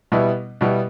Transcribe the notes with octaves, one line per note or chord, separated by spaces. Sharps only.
B2 G3 B3 E4
B2 G3 B3 E4